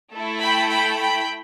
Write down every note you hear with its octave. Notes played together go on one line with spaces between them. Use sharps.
A3 E4 A4
G5 B5
G5 B5
G5 B5